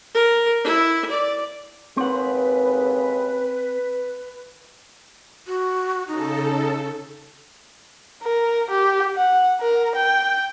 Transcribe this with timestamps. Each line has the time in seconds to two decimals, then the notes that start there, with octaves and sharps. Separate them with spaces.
0.14 A#4
0.64 E4
1.11 D5
1.97 D#2 G#2 C#3 C4 B4 F#5
5.47 F#4
6.08 C#3 D#4 A4
8.23 A#4
8.70 G4
9.16 F#5
9.60 A#4
9.96 G5